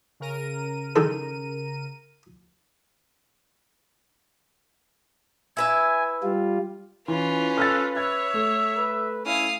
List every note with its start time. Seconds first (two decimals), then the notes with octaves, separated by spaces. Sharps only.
0.20 C#3 A#4 D#7
0.96 D#3 G#3 A4
5.57 E4 B4 E5 G#5
6.23 G3 F4
7.08 E3 C#4 F4 B4
7.58 A4 F6 F#6 A6
7.97 C#5 E5 G#6
8.34 A3
8.76 B4
9.26 C#4 E4 F5 D#6